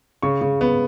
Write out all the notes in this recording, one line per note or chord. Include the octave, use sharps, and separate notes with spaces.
C#3 C#6
C#3
B3